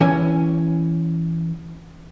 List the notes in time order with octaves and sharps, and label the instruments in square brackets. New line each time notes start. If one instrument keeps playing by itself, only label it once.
[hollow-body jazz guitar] E3 C#4 G#5